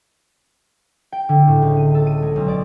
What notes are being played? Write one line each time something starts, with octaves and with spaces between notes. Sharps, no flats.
G5
D3
A2
C#2
D#7
A4
D#7
G#3
B1
D5